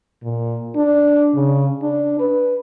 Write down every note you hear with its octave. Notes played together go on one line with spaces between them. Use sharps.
A#2
D4
C#3
D4
B4